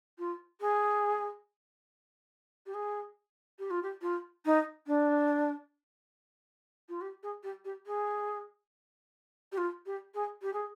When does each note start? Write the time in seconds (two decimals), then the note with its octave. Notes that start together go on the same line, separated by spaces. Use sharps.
0.19 F4
0.61 G#4
2.66 G4
2.74 G#4
3.59 G4
3.70 F4
3.83 G4
4.02 F4
4.45 D#4
4.87 D4
6.89 F4
7.01 G4
7.23 G#4
7.43 G4
7.65 G4
7.86 G#4
9.52 G4
9.57 F4
9.86 G4
10.14 G#4
10.42 G4
10.53 G#4